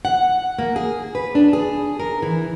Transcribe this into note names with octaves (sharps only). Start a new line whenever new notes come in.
F#5
A#3
G#4
B4
D4
G#4
A#4
E3